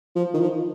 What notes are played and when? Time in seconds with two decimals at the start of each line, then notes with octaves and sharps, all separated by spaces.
0.16 F3
0.34 D#3
0.41 F3